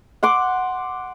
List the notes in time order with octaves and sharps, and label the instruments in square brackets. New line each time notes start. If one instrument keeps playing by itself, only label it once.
[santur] F#5 C6 D6